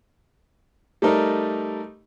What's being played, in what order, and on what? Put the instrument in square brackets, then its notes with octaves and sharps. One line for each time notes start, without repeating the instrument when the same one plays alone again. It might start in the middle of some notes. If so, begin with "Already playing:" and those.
[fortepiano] G3 A3 D#4 A#4